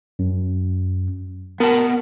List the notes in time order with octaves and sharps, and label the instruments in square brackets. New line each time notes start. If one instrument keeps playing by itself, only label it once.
[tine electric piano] F#2
[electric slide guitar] B3 A5 [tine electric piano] A#4